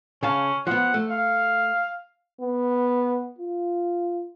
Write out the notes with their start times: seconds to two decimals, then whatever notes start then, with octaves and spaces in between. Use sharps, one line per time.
0.23 C#3 C#4 F5 A5
0.67 F3 B3 F#5
0.94 A3
1.10 F5
2.41 B3
3.39 F4